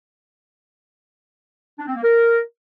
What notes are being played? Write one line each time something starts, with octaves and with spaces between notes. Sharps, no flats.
D4
C4
A#3
A#4